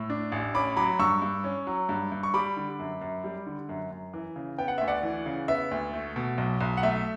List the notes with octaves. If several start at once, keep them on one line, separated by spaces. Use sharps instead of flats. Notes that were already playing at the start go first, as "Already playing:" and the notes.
Already playing: A2 E6
D4
A1
C#4 B5 D6
F#3 B5 D6
G2 C#6 E6
G2
C#4
F#3
G2
G2
C#6
G3 B5 D6
D3
F#2
F#2
G3
D3
F#2
F#2
E3
C#3
B3 G5
F#5
D2 E5
D5 F#5
E3
C#3
B3 E5
D2
A3
B2
B1
B1
F#5
A3 E5